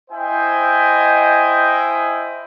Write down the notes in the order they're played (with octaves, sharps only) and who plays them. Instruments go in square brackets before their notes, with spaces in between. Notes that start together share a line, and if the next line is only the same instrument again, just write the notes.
[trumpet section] E4 C5 D#5 G5 G#5